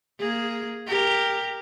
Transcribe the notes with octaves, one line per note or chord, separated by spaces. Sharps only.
A#3 G#4
G4 A#4